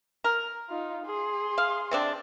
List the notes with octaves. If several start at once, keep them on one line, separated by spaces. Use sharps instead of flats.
A#4
D#4 F4
G#4 C6
F5
C3 C4 D4